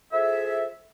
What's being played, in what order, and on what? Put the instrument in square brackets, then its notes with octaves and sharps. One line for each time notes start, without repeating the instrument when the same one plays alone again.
[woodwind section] F3 G#4 A4 E5